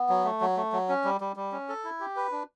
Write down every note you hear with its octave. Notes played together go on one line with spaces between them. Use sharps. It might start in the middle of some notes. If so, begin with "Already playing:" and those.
Already playing: B3
F#3
A3
F#3
A3
F#3
C#4
G3
G3
G3
C#4
A4
E4
G4
B4
D4